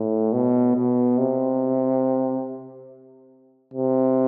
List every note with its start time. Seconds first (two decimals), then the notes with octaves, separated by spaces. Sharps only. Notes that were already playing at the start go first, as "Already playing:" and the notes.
Already playing: A2
0.33 B2
0.76 B2
1.18 C3
3.74 C3